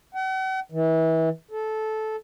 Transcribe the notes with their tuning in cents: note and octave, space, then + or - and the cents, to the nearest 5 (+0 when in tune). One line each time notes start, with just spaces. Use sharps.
F#5 +45
E3 -30
A4 -15